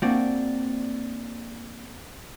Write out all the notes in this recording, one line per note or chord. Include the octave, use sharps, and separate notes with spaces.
A#3 C4 D4 F#4 D5